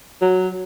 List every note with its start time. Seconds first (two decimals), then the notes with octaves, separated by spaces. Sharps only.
0.21 F#3